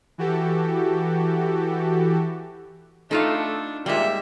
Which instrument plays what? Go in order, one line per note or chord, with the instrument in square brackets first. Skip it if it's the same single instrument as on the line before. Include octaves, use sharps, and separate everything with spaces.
[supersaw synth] E3 F#4 G4 A4
[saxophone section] A3 A4 [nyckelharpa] D4 [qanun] D#4 F4 F5
[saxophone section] A#2 [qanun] G3 G#3 [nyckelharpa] E5